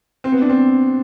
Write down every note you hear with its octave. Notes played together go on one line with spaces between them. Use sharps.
C4
B3
D4
C4